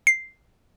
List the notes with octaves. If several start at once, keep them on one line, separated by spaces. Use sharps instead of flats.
C7